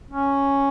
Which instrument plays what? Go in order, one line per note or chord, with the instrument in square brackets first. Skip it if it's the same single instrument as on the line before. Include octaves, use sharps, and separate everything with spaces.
[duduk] C#4